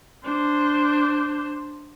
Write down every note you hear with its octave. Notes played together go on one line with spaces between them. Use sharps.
D4 C5